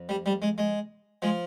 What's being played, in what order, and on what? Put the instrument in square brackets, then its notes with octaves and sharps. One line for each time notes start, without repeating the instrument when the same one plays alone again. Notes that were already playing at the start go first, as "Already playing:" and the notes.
Already playing: [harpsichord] F2
G3
G3
G#3
G#3
F3 G#3